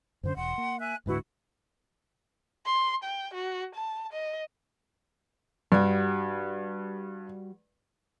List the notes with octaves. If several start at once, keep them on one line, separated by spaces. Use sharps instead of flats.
F#2 D3 C#4 C5
E1 F#5 C6
A#3
E5 G#5 F#6
D1 G#2 D3 E4 F#4 B4
C6
G5
F#4
A5
D#5
G2 G3 F#4